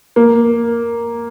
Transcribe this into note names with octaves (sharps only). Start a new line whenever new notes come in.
A#3